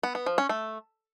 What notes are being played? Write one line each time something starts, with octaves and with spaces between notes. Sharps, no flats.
B3
B3
F3
C#4
A3